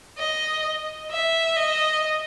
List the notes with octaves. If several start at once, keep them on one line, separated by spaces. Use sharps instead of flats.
D#5
E5
D#5